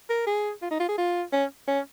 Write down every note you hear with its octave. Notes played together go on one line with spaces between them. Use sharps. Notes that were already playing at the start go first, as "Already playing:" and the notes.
A#4
G#4
F4
D#4
F4
G#4
F4
C#4
C#4